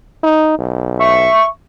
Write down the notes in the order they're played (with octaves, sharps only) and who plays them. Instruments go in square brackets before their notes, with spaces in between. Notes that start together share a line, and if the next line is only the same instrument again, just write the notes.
[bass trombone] D#4
B1
[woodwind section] E5 C#6